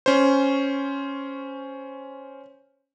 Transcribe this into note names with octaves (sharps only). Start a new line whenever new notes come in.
C#4 C5